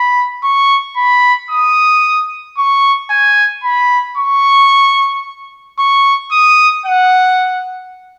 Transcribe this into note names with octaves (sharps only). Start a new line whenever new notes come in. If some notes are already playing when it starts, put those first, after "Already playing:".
Already playing: B5
C#6
B5
D#6
C#6
G#5
B5
C#6
C#6
D#6
F#5